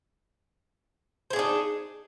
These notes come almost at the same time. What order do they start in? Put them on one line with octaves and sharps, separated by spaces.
C5 G#4 D4 D#4